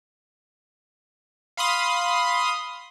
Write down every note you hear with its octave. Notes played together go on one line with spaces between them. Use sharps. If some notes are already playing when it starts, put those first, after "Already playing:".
F5 B5 C6 D#6